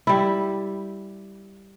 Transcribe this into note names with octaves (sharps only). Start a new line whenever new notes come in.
G3 E4